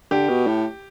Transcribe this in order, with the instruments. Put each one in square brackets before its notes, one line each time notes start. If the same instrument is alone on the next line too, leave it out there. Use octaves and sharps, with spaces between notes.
[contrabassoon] D3 [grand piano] G4
[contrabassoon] B2
A2